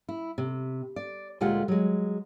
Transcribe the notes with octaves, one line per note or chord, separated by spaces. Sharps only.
E4
C3
D5
D2 A#2 G#3 F4 G4 F#5
F#3 G#3